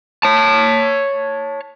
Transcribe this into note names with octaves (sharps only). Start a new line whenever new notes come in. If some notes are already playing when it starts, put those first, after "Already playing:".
C#5 A5